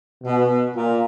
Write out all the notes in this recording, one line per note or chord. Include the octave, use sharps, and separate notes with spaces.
B2
A#2